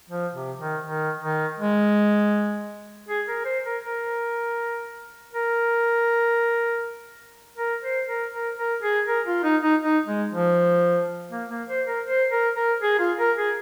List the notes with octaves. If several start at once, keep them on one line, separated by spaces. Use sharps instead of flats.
F3
C3
D#3
D#3
D#3
G#3
G#4
A#4
C5
A#4
A#4
A#4
A#4
C5
A#4
A#4
A#4
G#4
A#4
F4
D#4
D#4
D#4
G#3
F3
A#3
A#3
C5
A#4
C5
A#4
A#4
G#4
F4
A#4
G#4